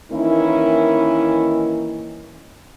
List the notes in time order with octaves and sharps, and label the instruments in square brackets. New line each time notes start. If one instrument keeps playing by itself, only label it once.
[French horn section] D#3 E3 A#3 C#4 D#4 E4